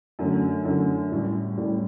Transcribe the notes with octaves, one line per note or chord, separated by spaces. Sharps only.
F#2 D3 A3 C#4
F#2 D3 A3 C#4
A2 G3 C#4
A2 G3 C#4